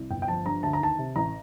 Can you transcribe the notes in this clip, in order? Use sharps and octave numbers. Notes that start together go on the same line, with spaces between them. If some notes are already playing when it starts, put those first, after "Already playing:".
Already playing: C2
G1 G5
G5
F3 A5
G2 A#5
D2 A5
A#5
D#3 A5
C3
A1 A#5